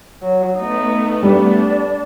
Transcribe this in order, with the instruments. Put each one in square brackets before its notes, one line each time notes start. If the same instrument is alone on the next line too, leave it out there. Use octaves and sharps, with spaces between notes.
[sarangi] F#3
[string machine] A3 B3 [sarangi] D#4
[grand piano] G3 [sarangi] D4